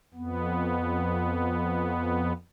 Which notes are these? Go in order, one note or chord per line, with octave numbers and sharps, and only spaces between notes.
F2 B3